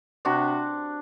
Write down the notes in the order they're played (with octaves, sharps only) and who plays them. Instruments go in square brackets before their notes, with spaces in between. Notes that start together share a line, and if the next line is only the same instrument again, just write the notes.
[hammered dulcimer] C3 D4 F#4